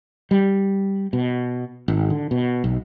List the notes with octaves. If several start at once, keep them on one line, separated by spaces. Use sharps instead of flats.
G3
B2
G#1
D3
B2
B1